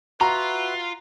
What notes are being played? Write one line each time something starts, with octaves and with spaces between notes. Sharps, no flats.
F4 F#4 B4 E5 F#5 A#5